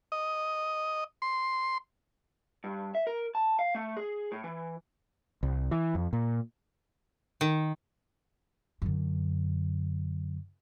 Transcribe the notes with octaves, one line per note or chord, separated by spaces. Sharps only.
D#5
C6
G2
E5
A#4
A5
F5
A3
G#4
A2
E3
C2
E3
F2
A#2
D#3
F#2 D3